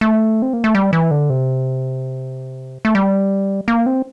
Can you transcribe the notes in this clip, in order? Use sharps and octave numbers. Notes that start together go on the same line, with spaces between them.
A3
C4
A#3
A3
G3
E3
D3
C3
A3
G3
A#3
C4